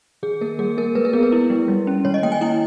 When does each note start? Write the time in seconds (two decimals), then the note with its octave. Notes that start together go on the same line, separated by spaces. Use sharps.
0.23 D#3 G#4
0.41 A#3 A#4
0.59 G3 G#4
0.77 A#3 A#4
0.95 G#3 B4
1.05 A#4
1.13 B3 G#4
1.23 B4
1.32 E4
1.50 G#3
1.68 G3
1.87 C#4
2.05 D#3 C#5
2.14 D#5
2.23 A#3 G5
2.32 G#5
2.41 E4 G5